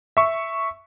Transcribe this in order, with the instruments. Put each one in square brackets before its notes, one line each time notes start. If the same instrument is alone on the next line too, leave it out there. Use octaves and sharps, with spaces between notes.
[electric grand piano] E5 C#6